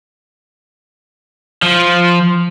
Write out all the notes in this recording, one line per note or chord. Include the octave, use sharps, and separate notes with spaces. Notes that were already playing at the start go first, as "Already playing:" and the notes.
F3